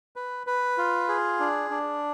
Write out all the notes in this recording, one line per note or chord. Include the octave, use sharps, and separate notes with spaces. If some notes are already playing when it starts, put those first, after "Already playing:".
B4
B4
F4
G#4
D4
D4